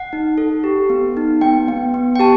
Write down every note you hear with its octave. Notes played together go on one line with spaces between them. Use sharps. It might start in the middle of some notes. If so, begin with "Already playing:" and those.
Already playing: F#5
D#4
A4
G4
B3
D#4
B3 G5
B3
B3
G5
G4 A5